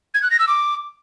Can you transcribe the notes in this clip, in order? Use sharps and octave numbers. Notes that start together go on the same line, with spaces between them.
G#6
F#6
A#6
E6
D6